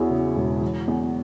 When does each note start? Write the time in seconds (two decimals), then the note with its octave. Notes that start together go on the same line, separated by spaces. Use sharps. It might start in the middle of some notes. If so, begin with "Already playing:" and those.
Already playing: E2 E3 E4 F#4 G#4 C#5
0.10 C#3
0.36 E1
0.61 E3
0.88 E2